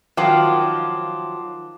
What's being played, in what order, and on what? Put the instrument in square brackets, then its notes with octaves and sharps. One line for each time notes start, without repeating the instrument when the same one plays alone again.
[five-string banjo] D#3 [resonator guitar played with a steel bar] F3 F#3 F4 [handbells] A5 C6 D6